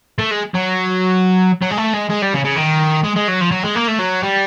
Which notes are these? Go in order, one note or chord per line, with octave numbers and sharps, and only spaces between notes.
A3
G#3
F#3
F#3
G#3
A3
G#3
G#3
G3
C#3
C#3
D#3
G#3
G#3
F#3
F3
F#3
G#3
A#3
A3
F#3
G3